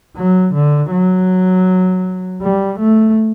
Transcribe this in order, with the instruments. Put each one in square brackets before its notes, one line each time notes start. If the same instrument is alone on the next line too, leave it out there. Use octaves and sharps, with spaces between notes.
[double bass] F#3
D3
F#3
G3
A3